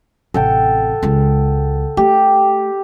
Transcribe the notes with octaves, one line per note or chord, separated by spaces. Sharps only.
A1 C3 A4 F#5 G5
C#2 G#3
A3 G4